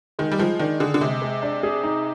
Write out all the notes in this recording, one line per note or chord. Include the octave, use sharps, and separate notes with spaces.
D#3 G#3
G3
F3 G#3
D#3 D4
D3 G#4
D3
C3 G#3
G#3
D4
G#4
D#4